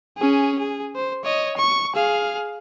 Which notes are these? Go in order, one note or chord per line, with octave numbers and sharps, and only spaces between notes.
C#4 G#4
G#4
C5
C#5 D#5
C#6
G#4 F5